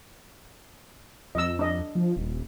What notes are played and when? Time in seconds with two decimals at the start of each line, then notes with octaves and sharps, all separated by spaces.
1.35 F2 D#5 E6
1.59 D4 D#5
1.95 F3
2.16 D#1